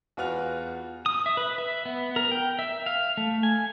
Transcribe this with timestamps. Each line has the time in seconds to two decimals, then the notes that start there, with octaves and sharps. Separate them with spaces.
0.17 E2 F4 F#4 B4 F6 F7
1.06 D#6
1.26 E5
1.37 B4
1.58 E5
1.85 B3
2.16 A#4
2.31 G5
2.59 E5
2.86 F5
3.17 A3
3.43 G#5